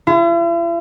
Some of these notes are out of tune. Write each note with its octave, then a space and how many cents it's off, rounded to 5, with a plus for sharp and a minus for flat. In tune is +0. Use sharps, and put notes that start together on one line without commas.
E4 +45